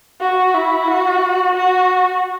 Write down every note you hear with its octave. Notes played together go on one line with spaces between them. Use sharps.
F#4
E4
F#4
F#4